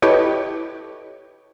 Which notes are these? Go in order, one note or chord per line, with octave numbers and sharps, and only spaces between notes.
E4 G4 A4 B4 C#5 D#5